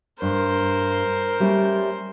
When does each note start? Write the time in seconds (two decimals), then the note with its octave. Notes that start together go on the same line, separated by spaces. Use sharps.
0.22 G2 A#4 C5
1.40 G3 A3 C#4